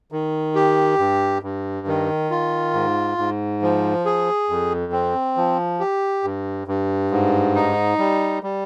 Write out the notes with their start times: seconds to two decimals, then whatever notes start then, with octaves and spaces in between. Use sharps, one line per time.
0.12 D#3
0.55 G4
0.99 G2
1.43 G2
1.87 D#3
2.31 F4
2.73 G#2
3.18 G#2
3.62 F3
4.05 G#4
4.49 F2
4.92 C4
5.37 F3
5.80 G4
6.24 G2
6.68 G2
7.11 G#2
7.55 D#4
7.98 G3
8.43 G3